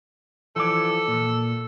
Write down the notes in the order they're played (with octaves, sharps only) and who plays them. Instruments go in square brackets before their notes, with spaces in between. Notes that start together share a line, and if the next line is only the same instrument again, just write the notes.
[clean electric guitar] E3 F3 D5 [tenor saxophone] A4
[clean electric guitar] A#2